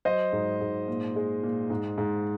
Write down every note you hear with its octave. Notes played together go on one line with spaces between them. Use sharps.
F#3 C5 D#5
G#2
G#2
A#2
G#3
A#2
G#2
G#2